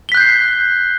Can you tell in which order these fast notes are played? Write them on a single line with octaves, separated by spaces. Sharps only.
G7 B6 F#6 G6 C7